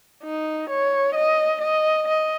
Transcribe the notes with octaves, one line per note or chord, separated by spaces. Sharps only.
D#4
C#5
D#5
D#5
D#5